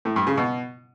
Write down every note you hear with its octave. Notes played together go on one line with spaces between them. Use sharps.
A2
G2
C#3
B2